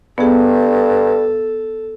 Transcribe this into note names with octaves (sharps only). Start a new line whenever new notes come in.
G2 B3 G#4 A4